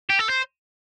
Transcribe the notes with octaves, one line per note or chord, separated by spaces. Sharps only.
G4
A4
C5